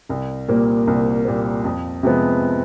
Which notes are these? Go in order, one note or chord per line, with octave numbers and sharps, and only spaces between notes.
C2
A#2 G3 A#3
C2
A#2 G3 A#3
F2
C3 F3 G#3 B3